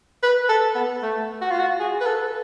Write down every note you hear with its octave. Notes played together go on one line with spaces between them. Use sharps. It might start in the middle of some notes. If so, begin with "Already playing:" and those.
B4
A4
B3
A3
F#4
F4
F#4
G#4
B4
A4